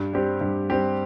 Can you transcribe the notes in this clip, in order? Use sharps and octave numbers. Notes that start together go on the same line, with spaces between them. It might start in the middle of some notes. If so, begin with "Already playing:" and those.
Already playing: G2
G3 C4 G4
G2
G3 C4 G4